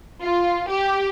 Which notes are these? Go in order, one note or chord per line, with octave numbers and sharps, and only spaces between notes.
F4
G4